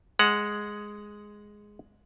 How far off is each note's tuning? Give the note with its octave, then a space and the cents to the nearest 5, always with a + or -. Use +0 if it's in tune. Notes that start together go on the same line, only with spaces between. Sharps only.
G#3 +0 F#5 +0